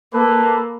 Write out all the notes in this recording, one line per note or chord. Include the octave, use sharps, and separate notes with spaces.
A#3 A4 B4